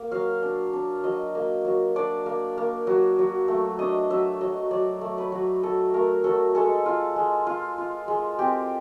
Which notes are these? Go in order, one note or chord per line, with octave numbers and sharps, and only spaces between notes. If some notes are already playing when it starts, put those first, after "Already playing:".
Already playing: A#3
F#3 F5
D4
D4
F#3 D#5
A#3
F#3
D4 D5
A#3
A#3
F#3
F#3
A3
D4 D#5
F#3 E5
F#3 D#5
F#3 D5
A3
B4
F#3
F#3 A4
A3 A#4
F#3 A4
G#3 A4
F4
G#3
F4
F4
G#3
C4 G4